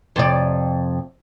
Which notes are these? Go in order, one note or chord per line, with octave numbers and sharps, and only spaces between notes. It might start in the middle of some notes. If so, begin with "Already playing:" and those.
F2 C3 D5